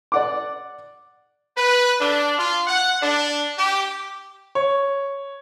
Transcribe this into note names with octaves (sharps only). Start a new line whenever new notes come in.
D5 F#5 D6
B4
D4
F4
F#5
D4
G4
C#5